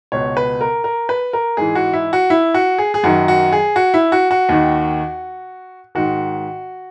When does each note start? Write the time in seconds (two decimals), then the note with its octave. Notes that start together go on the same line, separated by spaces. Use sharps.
0.12 C#2 B2 C#5
0.37 B4
0.61 A#4
0.84 A#4
1.09 B4
1.33 A#4
1.57 G#2 E3 G#4
1.75 F#4
1.93 E4
2.13 F#4
2.30 E4
2.54 F#4
2.78 G#4
2.94 G#4
3.03 F#2 D#3 F#4
3.28 F#4
3.52 G#4
3.76 F#4
3.94 E4
4.12 F#4
4.31 F#4
4.49 D#2 D#3
5.95 G#2 D#3 F#4